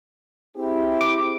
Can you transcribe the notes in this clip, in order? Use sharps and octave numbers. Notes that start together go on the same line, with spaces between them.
C4 E4 G4 G#4
D6